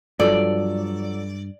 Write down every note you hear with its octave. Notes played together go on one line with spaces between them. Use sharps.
G2 F3 F#3 A4 D5